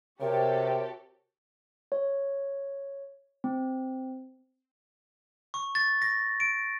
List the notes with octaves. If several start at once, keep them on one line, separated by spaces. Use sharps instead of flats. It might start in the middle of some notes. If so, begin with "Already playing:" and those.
C3 F#4 G4 A4 A#4 C#5
C#5
C4
C#6
A6
A#6
D7